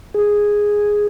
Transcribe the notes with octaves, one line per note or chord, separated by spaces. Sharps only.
G#4